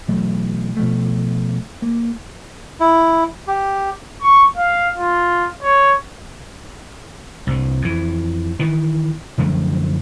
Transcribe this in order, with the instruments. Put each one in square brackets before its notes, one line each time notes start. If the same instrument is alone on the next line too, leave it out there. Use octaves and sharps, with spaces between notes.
[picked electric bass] B1 E3 F#3 A3
B2 F3 A3
A#3
[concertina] E4
G4
[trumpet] C#6
F5
F4
C#5
[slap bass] C2 G2
F2 E3
D#3 E3
F#2 D3 F3 A3